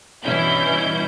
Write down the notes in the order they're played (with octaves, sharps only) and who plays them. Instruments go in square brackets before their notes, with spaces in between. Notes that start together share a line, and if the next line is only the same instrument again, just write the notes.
[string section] G2 B2 E3 C#4 E4 G6